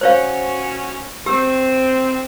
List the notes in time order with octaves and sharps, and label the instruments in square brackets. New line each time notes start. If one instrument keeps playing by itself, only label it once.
[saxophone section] C#4 F#4 [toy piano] C5 C#5 F5
[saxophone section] C4 [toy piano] G4 E6